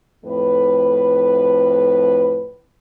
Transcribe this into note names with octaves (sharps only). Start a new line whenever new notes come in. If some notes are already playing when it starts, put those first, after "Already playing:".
F2 A2 B4